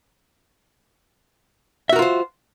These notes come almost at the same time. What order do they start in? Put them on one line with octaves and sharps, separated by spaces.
E5 F#4 A#4 F4 C5